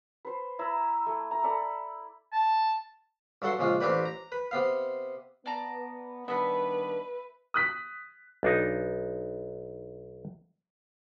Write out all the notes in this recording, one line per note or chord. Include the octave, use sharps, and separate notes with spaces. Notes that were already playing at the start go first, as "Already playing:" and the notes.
B4 C5
E4 A#5 B5 E6
A3
A#5
A4 D5 B5
A5
G2 F#3 A4 F#5 C6
A#1 C#3 G#3 F4
A1 C4 D4 G4 B4 D5
A#5
B4
C3 B3 F5
B3 D5 A5 A#5
D#3 G3 B3 D4 B4 E5 B5
D#6 F#6 B6
B1 D4 D#4